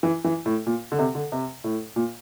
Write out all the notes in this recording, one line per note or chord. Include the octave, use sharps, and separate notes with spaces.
E3
E3
A2
A#2
D3
C3
D3
C3
A2
A#2